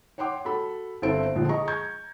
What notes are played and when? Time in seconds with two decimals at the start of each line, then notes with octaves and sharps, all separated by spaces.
0.18 C#5 F#5 G5 C6 D6
0.45 F#4 A4 B5
1.02 G1 C4 E4 A4 C5 D7
1.35 A#1 D3 F3
1.48 G#4 D#5 A#5 C#6
1.67 A#5 C#6 G6 G#6